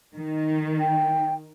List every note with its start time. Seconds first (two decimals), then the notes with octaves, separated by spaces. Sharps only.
0.17 D#3
0.79 G5